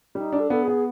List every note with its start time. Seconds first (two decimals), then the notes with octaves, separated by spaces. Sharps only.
0.15 G3 D#4
0.32 D4
0.39 A4
0.50 B3 A4
0.62 G#4
0.68 B3